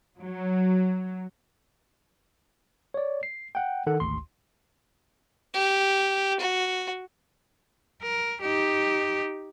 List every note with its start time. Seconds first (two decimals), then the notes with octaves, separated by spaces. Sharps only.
0.19 F#3
2.94 C#5 D5
3.23 C7
3.55 F#5 G5
3.87 D#3 A4 F#5
4.00 G#1 D2 C6
5.54 G4
6.39 F#4
8.03 A#4
8.42 D#4 G4